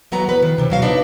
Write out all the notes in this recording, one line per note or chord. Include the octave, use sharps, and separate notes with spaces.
E3 F#3 B3 A#5
B4
D#3
C3 D4
B2 F#3 F5
D4 D#4 B4 D5